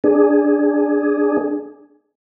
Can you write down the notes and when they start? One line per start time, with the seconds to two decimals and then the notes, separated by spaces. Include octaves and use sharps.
0.04 D4 G#4